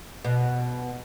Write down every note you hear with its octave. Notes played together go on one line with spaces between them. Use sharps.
B2